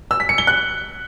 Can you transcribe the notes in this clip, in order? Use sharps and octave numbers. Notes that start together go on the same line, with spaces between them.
E6
B6
C#7
G7
F#6